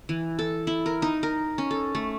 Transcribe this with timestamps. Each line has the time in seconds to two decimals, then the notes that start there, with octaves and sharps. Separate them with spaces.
0.09 E3
0.39 A4
0.67 E4
0.86 A#4
1.02 D#4
1.23 A#4
1.58 C#4
1.71 A4
1.95 A3